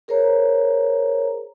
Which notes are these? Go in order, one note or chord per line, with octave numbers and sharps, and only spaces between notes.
G#4 A#4 C5 C#5 A#5